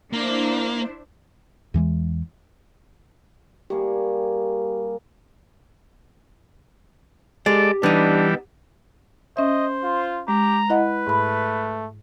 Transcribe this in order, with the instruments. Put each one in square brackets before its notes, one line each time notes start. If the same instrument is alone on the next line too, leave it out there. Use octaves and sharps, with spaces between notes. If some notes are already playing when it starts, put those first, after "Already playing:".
[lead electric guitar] A#3 [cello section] D4 E4 C5
[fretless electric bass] E2 E3 F3 G#3
[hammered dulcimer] G3 A#3 G#4 [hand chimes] G4
[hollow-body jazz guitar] G#3 [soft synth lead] G4 [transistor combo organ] A4 D5
[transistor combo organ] E3 G3 [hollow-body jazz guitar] B3 D#4 [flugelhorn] D4
[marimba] C#4 E5 [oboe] C5 [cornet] D#5
[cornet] F4
[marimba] G#3 [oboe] G4 [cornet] A#5
[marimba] E4 D#5 F#5 [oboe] B4
[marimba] G#2 B5 [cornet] A3